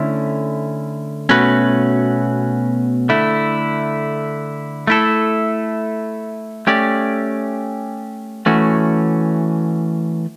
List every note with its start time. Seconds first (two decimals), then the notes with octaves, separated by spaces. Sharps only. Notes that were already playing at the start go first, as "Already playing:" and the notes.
Already playing: D3 A3 C#4 E4
1.29 B2 A3 C#4 F#4 B4
3.09 D3 A3 E4
4.87 A3 E4 A4
6.67 A3 C#4 G4 D5
8.46 E3 A3 C#4 F#4